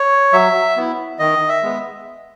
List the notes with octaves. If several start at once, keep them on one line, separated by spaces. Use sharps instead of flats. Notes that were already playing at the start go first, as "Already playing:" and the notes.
Already playing: C#5
F#3 E5
B3 E4
D#3 D#5
E5
G#3 B3